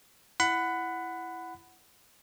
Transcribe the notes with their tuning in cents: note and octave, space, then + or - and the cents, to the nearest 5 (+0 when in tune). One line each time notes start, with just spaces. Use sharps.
E4 +10 F#5 +0 B5 +20